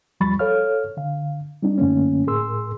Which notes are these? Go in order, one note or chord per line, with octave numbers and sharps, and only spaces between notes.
D#2 F3 G3 B5 C#6 A6
A4 C#5 F5 F6
D3 F5
G3 C4 D4 D#4
F#2 D3 A3 A#3 C#4
A2 G#4 A#4 C6 E6